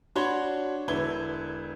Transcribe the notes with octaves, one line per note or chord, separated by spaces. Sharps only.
D4 F#4 C#5 B5 C6 G7
E1 D3 E4 B4 G#6 G7